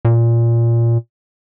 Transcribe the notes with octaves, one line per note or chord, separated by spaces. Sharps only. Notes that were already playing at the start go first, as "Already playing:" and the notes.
A#2